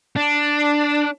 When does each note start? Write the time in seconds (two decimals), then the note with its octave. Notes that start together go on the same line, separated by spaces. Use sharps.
0.16 D4